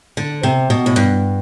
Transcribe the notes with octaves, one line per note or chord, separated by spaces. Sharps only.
D3
C3
B2
A2
G2